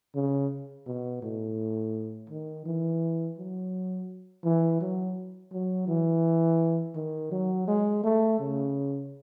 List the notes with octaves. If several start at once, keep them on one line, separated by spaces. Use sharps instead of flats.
C#3
B2
A2
D#3
E3
F#3
E3
F#3
F#3
E3
D#3
F#3
G#3
A3
C#3